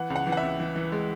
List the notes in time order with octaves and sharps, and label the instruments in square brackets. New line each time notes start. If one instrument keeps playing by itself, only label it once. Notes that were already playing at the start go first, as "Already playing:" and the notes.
Already playing: [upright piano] E3 F#5
C#2
F#5
E3
F#5
E5
C#2
E3
E3
G#3